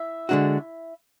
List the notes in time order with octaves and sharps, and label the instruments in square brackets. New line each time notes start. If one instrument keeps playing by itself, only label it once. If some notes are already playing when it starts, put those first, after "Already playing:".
Already playing: [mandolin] E4 E5
[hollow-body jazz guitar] D3 G#3 D4 F#4